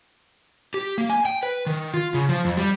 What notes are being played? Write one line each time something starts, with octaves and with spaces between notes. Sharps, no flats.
G4
A#3
G#5
G5
B4
D#3
F4
C#3
F3
F2
G3